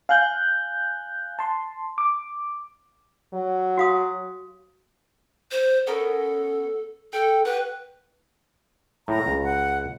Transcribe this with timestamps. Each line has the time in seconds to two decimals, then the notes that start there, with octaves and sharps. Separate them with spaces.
0.09 F5 G#5 F#6 G6
1.39 A5 C6
1.98 D6
3.34 F#3
3.78 F#4 F5 D#6
5.52 C5
5.87 B3 C#4 A4 A#4
7.13 A4 G5
7.45 F#4 G4 B4
9.08 A2 A#5
9.26 C#2
9.43 F#5